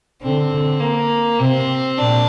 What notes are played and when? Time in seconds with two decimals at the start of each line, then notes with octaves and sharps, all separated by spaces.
0.22 D3 C4
0.80 A#3
1.39 C3 C4
1.98 A#2 D4